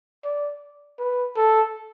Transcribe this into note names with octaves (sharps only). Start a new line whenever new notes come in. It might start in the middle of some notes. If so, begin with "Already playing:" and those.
D5
B4
A4